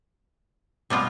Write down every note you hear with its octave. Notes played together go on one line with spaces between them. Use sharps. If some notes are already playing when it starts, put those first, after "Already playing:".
B2 G3 B3 F4